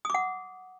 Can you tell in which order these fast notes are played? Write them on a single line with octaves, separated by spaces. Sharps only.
D#6 D6 F#5